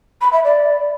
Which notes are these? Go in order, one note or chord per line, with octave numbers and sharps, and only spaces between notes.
B5
E5
D5